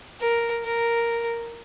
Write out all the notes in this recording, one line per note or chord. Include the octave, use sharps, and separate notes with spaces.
A#4
A#4